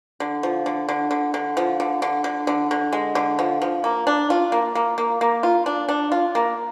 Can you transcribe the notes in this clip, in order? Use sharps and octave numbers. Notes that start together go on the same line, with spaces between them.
D3
F3
D3
D3
D3
D3
F3
D3
D3
D3
D3
D3
G#3
D3
F3
F3
A#3
D4
F4
A#3
A#3
A#3
A#3
F4
D4
D4
F4
A#3